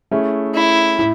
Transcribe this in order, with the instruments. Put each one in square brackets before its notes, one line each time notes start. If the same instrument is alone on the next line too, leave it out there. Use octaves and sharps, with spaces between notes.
[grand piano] A3 C#4 E4 G#4
[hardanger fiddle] E4
[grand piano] A2